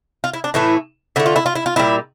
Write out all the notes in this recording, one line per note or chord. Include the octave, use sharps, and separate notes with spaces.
F4
E4
D4
A2 E3 A3 E4
D3 A3 E4
F4
E4
F4
E4
F4
A#2 G3 E4